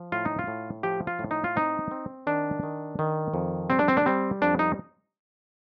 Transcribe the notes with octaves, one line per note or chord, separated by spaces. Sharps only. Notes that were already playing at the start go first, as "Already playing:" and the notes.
Already playing: F3
A2 F4
D#4
F4
A2
F3 G4
F4
A2
D#4
F4
C4 D#4
C4
D#3 D4
D#3
D#3
F2
G3 C4
D4
C4
D4
G3 C4
F2 D4
D#4